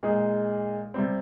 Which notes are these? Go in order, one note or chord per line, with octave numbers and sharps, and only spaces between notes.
A#2 G#3 D#4 G#4
C3 G3 C4